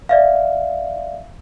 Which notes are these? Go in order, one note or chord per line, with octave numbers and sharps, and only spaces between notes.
D5 E5 F5